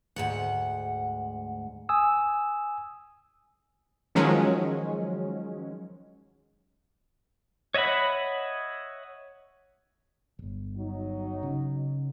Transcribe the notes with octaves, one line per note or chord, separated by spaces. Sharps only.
D2 G#2 F#5
G#5 D#6 E6
D#3 F3 F#3 G#3 C#4
C#5 D#5 E5 F#5 B5
D1 G1
F#3 D#4
C#3